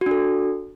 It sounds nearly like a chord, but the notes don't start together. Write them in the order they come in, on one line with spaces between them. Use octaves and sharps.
F#4 D4 A4